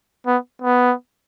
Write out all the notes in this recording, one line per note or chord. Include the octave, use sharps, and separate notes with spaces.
B3
B3